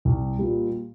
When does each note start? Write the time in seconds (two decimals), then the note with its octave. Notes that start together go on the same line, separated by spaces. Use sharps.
0.05 C2
0.39 A#2 G3